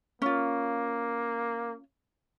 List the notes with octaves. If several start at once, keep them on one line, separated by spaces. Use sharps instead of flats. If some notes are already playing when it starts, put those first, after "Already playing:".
A#3 C#4 F4